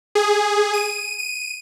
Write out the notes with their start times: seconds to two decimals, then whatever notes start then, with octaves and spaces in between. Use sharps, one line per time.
0.15 G#4
0.73 D#7
1.19 D#7